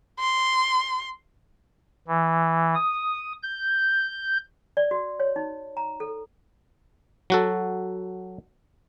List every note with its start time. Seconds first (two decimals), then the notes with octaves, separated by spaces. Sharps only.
0.20 C6
2.08 E3
2.75 D#6
3.43 G6
4.77 D5
4.91 F#4
5.20 C#5
5.36 D#4
5.77 A#5
6.00 A4
7.30 F#3 F#4 A4